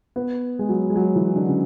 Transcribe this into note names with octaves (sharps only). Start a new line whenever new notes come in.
B3
G#3
F#3
G#3
F#3
E3
D3
C#3